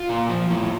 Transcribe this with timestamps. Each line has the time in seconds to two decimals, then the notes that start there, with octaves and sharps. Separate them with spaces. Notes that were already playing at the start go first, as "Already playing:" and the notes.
Already playing: F4
0.09 A#2
0.29 F3
0.50 A2